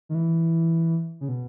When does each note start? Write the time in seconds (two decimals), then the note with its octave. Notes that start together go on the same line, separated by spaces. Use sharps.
0.09 D#3
0.14 E3
1.21 C#3
1.29 B2